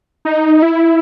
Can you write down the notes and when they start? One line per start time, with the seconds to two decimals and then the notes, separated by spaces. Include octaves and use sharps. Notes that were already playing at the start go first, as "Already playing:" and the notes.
0.25 D#4
0.62 E4